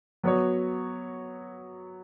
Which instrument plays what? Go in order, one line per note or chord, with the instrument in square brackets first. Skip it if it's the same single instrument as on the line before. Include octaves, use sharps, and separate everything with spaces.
[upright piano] F#3 B3 F#4 C#5